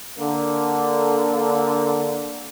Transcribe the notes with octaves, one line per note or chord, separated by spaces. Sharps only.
D3 A#3